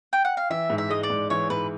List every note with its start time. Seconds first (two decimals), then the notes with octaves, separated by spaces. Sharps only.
0.13 G5
0.25 F#5
0.37 F5
0.50 E3 E5
0.70 G#2
0.78 E5
0.90 G#3 D#5
1.03 D5
1.10 G#2
1.30 E3 C#5
1.50 G#2 B4